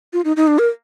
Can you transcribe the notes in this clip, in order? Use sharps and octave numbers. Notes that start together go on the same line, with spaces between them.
F4
D#4
D#4
D4
A#4